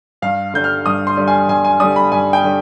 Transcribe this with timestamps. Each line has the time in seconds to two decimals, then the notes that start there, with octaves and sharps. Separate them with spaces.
0.22 G2 F5
0.54 D3 G3 G6
0.64 F6
0.86 G2 D#6
1.07 C6
1.17 D3 G3
1.28 G#5
1.49 G2 G#5
1.64 G#5
1.80 D3 G3 D#6
1.96 B5
2.11 G2 G#5
2.33 G5
2.44 D3 G3